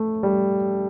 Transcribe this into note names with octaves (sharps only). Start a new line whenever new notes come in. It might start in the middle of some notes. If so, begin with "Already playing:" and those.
Already playing: A3
G3